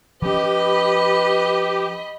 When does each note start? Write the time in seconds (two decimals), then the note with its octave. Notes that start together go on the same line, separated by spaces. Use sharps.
0.22 F3 C#4 G4 B4 D#5 B5